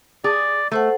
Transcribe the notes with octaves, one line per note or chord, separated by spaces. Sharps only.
G#4 D5
A3 A4 C5 F#5